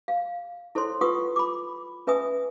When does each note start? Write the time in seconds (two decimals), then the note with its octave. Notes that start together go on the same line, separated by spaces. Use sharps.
0.08 F5
0.75 E4 A4 C5 C#5 C6
1.01 F4 B4 F#5 C#6 D#6
1.36 B5 D6
2.07 C#4 B4 E5 G#5 D#6